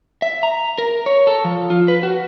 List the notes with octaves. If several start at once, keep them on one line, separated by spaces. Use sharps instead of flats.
E5
A#5
A#4
C#5
A4
F3
F4
B4
F#4